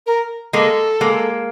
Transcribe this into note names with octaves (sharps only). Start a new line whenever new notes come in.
A#4
G#3 A#3 A4
G#3 A#3